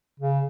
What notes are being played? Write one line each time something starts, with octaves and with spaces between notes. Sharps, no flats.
C#3